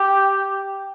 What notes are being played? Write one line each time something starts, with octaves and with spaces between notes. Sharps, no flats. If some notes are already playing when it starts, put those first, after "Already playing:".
Already playing: G4